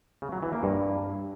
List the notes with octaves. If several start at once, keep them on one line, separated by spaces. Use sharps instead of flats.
C#3
F#3
E3
A#3
G2